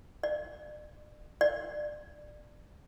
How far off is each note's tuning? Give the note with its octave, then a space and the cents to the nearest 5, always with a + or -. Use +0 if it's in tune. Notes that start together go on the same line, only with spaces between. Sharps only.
D5 +35
D5 +20